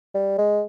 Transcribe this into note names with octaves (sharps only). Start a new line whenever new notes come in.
G3
G#3